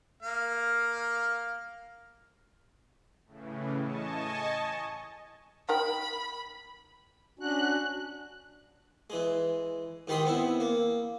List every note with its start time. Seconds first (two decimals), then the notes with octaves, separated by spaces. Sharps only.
0.23 A#3 F5
3.26 A2 C#3 E3
3.82 D#5 G#5 A5 C#6
5.69 D#4 A#4 G5 B5
7.39 C#4 D4 F#4 F#6
9.10 E3 G#3
10.07 G#2 D#3 G4 B5 C6 D#6
10.25 B3 C4 E4
10.60 A#3